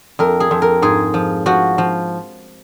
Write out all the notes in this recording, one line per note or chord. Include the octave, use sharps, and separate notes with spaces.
F2 A#4
G#4
F2
A#4
G#2 G#4
F3
F3 F#4
F3